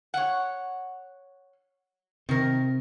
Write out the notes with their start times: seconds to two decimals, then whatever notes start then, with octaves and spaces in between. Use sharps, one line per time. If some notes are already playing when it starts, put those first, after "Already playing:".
0.14 C#5 F#5
2.29 C3 D#3 A#4